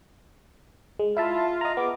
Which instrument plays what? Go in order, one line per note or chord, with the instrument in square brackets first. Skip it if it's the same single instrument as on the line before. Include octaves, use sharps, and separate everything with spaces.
[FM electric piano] G#3
[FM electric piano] E4 E5 A5 [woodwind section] F4
[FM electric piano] D#5 A#5
[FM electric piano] B3 [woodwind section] G#4 E5 D6